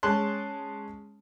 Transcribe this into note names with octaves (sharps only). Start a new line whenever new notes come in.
G#3 C#4 A5 C6 F#6